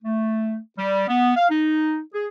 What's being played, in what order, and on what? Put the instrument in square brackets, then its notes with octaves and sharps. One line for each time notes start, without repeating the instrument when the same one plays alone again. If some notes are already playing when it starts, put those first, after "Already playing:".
[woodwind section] A3
G3
B3
F5
D#4
G#4